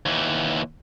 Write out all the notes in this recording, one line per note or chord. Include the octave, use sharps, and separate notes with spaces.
D#2 E3